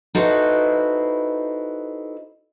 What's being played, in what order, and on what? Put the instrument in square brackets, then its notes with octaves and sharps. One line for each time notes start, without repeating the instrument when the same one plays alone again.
[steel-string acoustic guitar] D#4 E4 F#4 A4 B4 C5